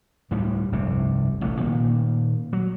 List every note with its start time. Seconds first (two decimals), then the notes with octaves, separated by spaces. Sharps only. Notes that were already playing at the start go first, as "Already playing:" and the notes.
0.31 D2 A2 G3
0.72 F1 C2 G2 C3
1.41 A1 C3 A3
1.60 A#2 D#3 A#3
2.53 F#3